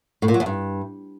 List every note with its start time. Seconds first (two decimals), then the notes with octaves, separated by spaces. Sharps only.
0.22 A2
0.28 A#2
0.34 F#3
0.40 E2
0.46 G2